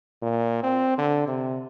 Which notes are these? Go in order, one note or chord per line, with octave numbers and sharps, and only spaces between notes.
A#2
C4
D3
C3